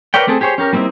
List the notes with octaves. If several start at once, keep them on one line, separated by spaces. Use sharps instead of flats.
A#4 B4 C#5 D5 G5
A3 C4 G#4 A4
G4 G#4 C5 C#5
C#4 G4 A#4
G3 A#3 C4 D#4 E4